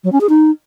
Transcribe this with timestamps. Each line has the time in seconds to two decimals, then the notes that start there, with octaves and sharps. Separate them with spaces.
0.04 F#3
0.12 C#4
0.21 G#4
0.29 D#4